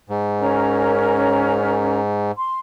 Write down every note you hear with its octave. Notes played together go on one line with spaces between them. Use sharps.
G#2
C#4 A#4 A#5
C6